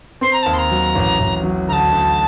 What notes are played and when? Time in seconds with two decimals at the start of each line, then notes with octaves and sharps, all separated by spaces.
0.21 C4 C6
0.33 A#5
0.42 D#2 A5
0.53 C6
0.58 A#5
0.71 F#3
0.95 A1
1.20 A1
1.43 F#3
1.68 D2 A5 A#5
1.92 D2